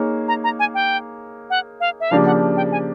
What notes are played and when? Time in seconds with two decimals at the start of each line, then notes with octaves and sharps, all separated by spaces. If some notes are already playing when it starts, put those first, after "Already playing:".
Already playing: A#3 D#4 G#4 C#5
0.28 A#5
0.44 A#5
0.59 G#5
0.74 G5
1.50 F#5
1.80 F5
2.00 E5
2.11 C#3 F3 A#3 D4 G4 F5
2.26 F#5
2.57 G5
2.72 G#5